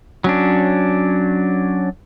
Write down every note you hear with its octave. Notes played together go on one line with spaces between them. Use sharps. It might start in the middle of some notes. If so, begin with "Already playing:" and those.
F#3 C#4 D4